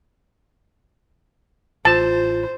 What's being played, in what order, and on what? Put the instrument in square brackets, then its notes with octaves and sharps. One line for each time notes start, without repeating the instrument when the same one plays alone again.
[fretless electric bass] A1 [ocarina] F4 [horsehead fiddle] C5 [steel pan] A5